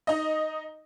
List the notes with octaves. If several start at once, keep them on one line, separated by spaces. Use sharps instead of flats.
D#4 D#5